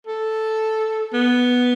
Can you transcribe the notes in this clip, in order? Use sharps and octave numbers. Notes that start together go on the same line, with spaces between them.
A4
B3